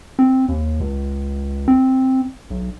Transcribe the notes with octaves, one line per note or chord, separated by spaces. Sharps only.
C4
D#2
C#2
C4
B1